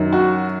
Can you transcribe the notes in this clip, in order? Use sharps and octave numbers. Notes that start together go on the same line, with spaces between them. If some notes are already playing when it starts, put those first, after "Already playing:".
Already playing: F#2 D#3 F#3
F#4